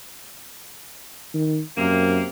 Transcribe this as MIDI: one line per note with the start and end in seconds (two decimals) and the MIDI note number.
1.34 1.60 51
1.78 2.23 42
1.78 2.29 48
1.78 2.29 58